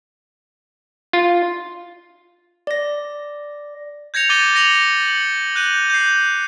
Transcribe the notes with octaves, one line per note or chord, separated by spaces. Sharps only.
F4
D5 A#6
G6 G#6 A#6 C#7 F7
D6 G#6 A6 D#7 G7
A#6 C#7 F7 F#7
F#7
F#6 G6 D#7 F#7
G6 C7